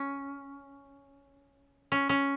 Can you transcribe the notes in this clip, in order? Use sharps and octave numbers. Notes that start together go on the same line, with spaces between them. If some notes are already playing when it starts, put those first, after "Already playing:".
Already playing: C#4
C#4
C#4